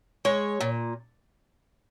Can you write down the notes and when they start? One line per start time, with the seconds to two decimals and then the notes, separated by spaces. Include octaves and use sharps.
0.25 G#3 C#5
0.61 A#2